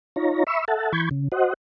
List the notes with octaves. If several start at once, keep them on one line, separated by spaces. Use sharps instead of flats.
D#4 F4 C#5 A#5
E5 B5 C#6 E6
A4 E5 F#5 A5
E3 B5 C#6 G6 G#6
C#3
F#4 C5 D#5 F#5